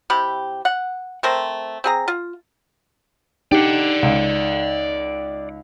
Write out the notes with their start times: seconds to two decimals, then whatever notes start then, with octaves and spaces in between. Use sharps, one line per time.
0.10 C3 E4 G4 B5
0.65 F#5
1.23 A3 C4 A#4 C5
1.84 C4 G#4 A#5
2.08 F4
3.52 D4 D#4 G4 D5 F#5
4.03 C#2